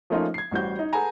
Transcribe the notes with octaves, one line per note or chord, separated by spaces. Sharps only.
F3 A3 A#3 C#4 D#4 F4
G#6 C7
A1 G3 F#4 C5 G6
D#4
G#4 A4 B4 F#5 G#5 A#5